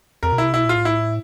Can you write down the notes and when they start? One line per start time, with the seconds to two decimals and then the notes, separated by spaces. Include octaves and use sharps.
0.23 F2 A#4
0.32 B2
0.38 E4
0.44 C3
0.54 B2 E4
0.65 A#2 F4
0.75 A2
0.85 E4